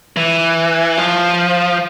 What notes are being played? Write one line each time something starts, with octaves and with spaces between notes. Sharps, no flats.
E3
F3